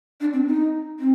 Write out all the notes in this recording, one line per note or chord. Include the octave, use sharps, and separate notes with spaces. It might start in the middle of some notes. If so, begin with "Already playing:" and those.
D4
C4
D#4
C4